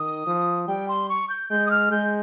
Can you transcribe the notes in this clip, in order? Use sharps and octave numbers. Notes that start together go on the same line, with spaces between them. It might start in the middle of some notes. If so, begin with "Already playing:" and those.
Already playing: D#3 D#6
F3
G3 G5
C6
C#6
G6
G#3 G6
D#6
F6
G#3 G6